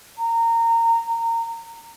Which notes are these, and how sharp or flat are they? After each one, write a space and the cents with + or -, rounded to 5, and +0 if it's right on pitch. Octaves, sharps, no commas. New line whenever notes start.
A#5 -20